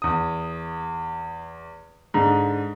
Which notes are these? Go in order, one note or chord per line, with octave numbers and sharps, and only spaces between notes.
E2 D#6
G#2 D3